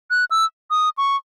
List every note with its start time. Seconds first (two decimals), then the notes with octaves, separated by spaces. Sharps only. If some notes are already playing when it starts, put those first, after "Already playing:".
0.11 F#6
0.31 E6
0.71 D#6
0.98 C#6